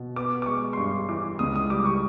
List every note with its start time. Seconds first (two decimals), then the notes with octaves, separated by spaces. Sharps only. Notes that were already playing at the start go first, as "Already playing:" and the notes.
Already playing: B2
0.16 B3 D6
0.42 D6
0.46 G#3 C#6
0.73 C6
0.78 G2 C#6
1.09 E3 D6
1.39 C#2 D#6
1.56 D#6
1.70 G3 D6
1.85 C#6